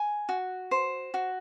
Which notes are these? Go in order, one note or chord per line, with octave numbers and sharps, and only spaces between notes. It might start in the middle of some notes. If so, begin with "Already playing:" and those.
Already playing: G#5
F#4
C5
F#4